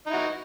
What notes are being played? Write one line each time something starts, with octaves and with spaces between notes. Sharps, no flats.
D#4 E4 F#4